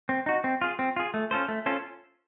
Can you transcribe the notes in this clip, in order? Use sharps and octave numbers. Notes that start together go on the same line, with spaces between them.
C4
D#4 F#4
C4
F4 G#4
C4
F4 G#4
A3
C#4 F4 A4 C5
A3
C#4 F4 A4 C5